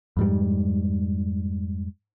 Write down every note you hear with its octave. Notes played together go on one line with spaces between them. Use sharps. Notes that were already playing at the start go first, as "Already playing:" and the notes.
F2 G#2 G3